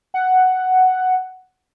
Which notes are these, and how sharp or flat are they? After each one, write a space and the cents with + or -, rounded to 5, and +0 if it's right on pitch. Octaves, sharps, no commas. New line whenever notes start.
F#5 +5